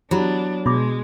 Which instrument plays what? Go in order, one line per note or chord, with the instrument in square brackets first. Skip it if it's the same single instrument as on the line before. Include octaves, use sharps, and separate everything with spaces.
[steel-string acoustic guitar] F#3 [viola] B3 D4 [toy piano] E4 G4 B5
[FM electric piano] B2 [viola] G#3 [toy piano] B5 D6